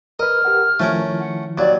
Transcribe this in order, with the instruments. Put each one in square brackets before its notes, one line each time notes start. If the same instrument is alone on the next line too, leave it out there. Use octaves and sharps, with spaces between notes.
[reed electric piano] A#4 B4 [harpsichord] D#5 [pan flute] F6
[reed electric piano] G4 A#4 F#5
[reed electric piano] D#3 F3 E4 [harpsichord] A3 C#4 A#4
[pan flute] F#5
[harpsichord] D#2 F#3 [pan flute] D5